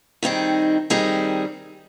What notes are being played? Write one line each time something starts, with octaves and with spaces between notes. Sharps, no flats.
D#3 G3 C4 D#4 G#4
D#3 G3 C4 D#4 G#4